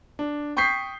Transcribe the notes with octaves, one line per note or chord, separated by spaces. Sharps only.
D4
G5 C#6 D#6 G6 B6 C7